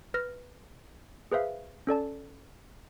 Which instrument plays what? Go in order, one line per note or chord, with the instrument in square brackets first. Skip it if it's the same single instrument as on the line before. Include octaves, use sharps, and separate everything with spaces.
[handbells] B4 F6 A#6
G#4 B4 C5 E5 F5
C#4 A4 D5 A5